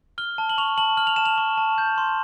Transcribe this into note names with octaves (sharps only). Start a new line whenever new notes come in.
F6 G7
A5
F#7
C#6 F7
A5 F#7
F6 F#7
F7
A5 E7
F7
C#6
A5
G6
C6